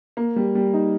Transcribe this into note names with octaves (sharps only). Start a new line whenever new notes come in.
A#3
G3
G3
D#4